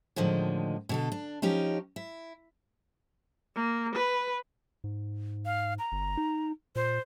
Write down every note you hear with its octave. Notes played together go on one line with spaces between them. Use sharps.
A2 D3 D#3 F3 G#3
B2 D3 A4
D4
F3 C#4 D#4 G4
E4
A#3
B4
G#2
F5
A#5
G1
D#4
A#2 C5